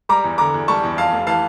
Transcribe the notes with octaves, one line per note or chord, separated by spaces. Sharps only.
G3 A#5 D6
E2
D3 A#5 D6
E2
G3 A5 C#6
E2
F2 F5 A5
F1
E3 F5 A5